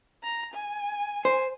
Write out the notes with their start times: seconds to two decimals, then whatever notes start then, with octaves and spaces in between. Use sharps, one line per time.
0.24 A#5
0.54 G#5
1.25 C5